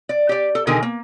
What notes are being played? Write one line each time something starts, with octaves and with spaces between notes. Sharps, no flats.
D5
G4 D5
A4
B2 D3 D#3 G#4 A#4 G#5
A#3